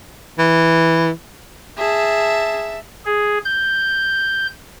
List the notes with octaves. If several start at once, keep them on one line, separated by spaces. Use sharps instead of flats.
E3
G#4 E5 A5
G#4
G6